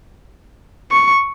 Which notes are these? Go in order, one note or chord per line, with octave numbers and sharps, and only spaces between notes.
C#6